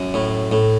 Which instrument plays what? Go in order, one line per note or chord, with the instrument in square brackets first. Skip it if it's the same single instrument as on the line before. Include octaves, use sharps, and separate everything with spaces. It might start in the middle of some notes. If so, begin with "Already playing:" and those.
Already playing: [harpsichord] F#2
A2
A2